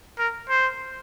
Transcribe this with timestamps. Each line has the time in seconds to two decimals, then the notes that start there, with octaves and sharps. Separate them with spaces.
0.19 A#4
0.49 C5